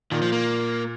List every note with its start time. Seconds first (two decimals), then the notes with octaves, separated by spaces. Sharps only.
0.11 A#2 D#3
0.22 F3
0.32 A#3